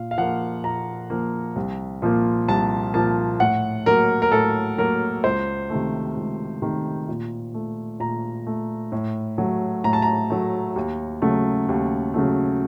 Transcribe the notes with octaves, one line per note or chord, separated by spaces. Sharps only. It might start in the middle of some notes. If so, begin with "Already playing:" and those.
Already playing: A#2 F5
F5
F3 A#3 F#5
A#2 A#5
F3 A#3
C2
A#2 F3 A#3
C2 A5
A#2 F3 A#3 A5
A2 F#5
F#3 A#3 A#4
A#4
A2 A4
F#3 A#3 A#4
C#2 C5
C3 D#3 A3
C#2
C3 D#3 A3
A#2
A3
A#2 A#5
A3
A2
F#3 A3
A2 A#5
A5
A#5
F#3 A3
D#2
C#3 F#3 A3
D#2
C#3 F#3 A3